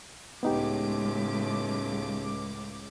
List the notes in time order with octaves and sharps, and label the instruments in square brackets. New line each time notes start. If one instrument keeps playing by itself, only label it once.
[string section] C#2 D6 [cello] A2 G#3 [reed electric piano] B3 D#4 G4